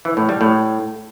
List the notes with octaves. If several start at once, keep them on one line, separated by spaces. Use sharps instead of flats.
E3
A2
G3
A2